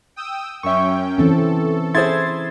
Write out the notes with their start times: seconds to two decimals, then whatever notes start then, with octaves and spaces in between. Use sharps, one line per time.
0.16 G5 D#6 E6
0.63 F#2 C#4 E5 G5 C#6
1.18 E3 C4 C#4 A4
1.94 E4 G#4 C5 C6 G#6 A6